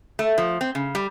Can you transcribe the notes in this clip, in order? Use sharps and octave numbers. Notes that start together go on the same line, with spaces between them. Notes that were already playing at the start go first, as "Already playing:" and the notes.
A3
F3
C4
C#3
G3